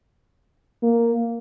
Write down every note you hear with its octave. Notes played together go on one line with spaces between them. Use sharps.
A#3